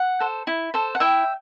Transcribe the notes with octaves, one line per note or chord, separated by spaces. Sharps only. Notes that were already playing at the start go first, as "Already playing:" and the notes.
Already playing: F#5
A4 C5
E4
A4 C5
F#5
E4 E5 G5